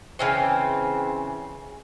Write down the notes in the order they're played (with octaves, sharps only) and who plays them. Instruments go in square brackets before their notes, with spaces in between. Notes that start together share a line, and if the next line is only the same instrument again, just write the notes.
[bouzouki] C#3 E3 C4